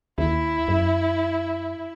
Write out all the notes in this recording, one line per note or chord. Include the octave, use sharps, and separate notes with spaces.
D#2 E4
F#2